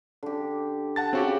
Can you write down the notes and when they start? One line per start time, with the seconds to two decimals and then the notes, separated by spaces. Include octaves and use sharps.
0.23 D3 G4
0.96 F#5 A5 A6
1.13 C#3 C4 F#4 G4